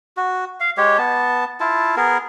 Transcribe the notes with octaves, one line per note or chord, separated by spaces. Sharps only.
F#4
F5
G#3 G4 C#5
B3 A5
E4 F4 A5
B3 G#4 A#4